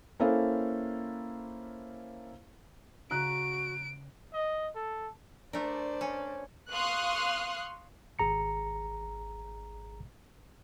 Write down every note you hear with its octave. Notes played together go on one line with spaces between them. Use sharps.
A#3 C#4 E4 A4 C5 F5
C#3 F#4 A#5 F#6 B6 D7
D#5
A4
A3 D4 A#4 C5 D5
C#4
F5 C6 C#6 D#6 F6 F#6
G#1 G#4 A#5 C#7